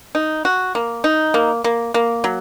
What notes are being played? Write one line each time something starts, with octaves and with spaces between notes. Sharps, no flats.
D#4
F#4
A#3
D#4
A#3
A#3
A#3
F#3